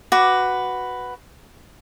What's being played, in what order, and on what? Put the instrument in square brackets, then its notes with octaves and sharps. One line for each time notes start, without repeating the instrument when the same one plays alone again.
[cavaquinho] F#4 B4 D6